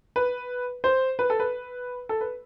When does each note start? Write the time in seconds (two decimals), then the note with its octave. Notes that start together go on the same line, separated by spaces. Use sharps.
0.16 B4
0.84 C5
1.19 B4
1.30 A4
1.40 B4
2.09 A4
2.21 B4